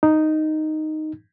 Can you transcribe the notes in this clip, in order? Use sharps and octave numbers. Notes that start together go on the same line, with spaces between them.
D#4